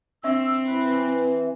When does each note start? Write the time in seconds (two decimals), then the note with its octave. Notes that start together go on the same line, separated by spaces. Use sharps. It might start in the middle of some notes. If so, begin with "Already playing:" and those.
0.24 C4 D4 E5 C#6 E6
0.66 E3 B4